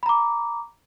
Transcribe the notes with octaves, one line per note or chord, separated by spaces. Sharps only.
A#5 B5 D6